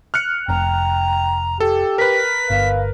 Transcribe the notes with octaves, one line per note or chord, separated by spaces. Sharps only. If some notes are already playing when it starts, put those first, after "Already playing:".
F6 F#6 C#7
F1 G5 A#5
G4 A4
A#4 B4 B6
G1 F5